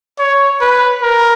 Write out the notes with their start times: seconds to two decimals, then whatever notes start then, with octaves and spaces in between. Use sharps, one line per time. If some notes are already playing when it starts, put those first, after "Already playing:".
0.19 C#5
0.61 B4
1.02 A#4